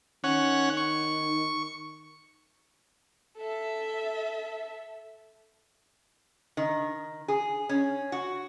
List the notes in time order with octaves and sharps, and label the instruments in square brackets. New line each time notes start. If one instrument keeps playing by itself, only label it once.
[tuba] D#3 [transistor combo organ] C#4 F#5
[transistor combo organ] C#6
[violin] A4 E5
[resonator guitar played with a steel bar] D#3
G#4
C#4
F#4